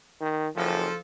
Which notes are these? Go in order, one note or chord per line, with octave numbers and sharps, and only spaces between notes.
D#3
F#1 F3 A4